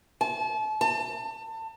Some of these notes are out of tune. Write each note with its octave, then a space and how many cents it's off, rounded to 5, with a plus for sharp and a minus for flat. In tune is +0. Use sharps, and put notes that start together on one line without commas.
A5 -35
A5 +30